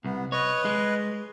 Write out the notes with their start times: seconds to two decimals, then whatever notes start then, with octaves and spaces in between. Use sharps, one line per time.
0.05 C2 B3
0.32 B4 C#5 D#5
0.65 G#3